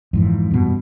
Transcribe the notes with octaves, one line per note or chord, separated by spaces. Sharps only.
F2 G#2 E3
G2 B2